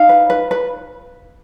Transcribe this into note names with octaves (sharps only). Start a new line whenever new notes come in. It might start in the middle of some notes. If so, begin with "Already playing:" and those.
Already playing: D#4 F5
B4
B4
B4